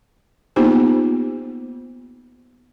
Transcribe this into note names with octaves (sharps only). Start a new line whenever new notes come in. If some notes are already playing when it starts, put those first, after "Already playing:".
A#3 B3 D#4 F4 G4 C5